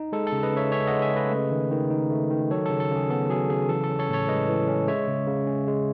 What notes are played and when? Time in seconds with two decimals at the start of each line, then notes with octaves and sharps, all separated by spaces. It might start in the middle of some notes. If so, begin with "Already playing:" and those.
Already playing: D#4
0.12 G#3 A4
0.27 A4
0.32 C#3
0.43 B4 D#5
0.53 C#3 C#5 E5
0.72 C#4 C#5 E5
0.87 G#3 D#5 F#5
1.02 E5 G#5
1.12 C#3 B4 D#5
1.31 A3
1.51 D#3
1.71 D#3
1.90 D#4
2.11 A3
2.30 D#3
2.51 F#3 A4 C#5
2.66 C#3 A4
2.80 A4
2.90 C#3
2.96 G#4
3.10 B3 A4
3.29 F#3 G#4
3.50 C#3 G#4
3.69 E3 A4
3.84 A4
3.90 C#4
3.99 A4 C#5
4.09 A2 A4 C#5
4.28 G#3 B4 D#5
4.49 E3
4.68 C#4
4.88 G#3 C#5 E5
5.08 C#3
5.28 C#3
5.47 C#4
5.68 G#3